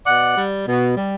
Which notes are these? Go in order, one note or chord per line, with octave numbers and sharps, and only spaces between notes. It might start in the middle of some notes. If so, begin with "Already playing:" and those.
B2 D5 F#5
G3
B2
G3